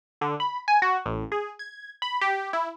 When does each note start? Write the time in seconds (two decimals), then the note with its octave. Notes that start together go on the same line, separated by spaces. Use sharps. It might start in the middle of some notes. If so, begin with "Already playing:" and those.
0.21 D3
0.40 B5
0.68 G#5
0.82 F#4
1.06 A1
1.32 G#4
1.59 G#6
2.02 B5
2.21 G4
2.53 E4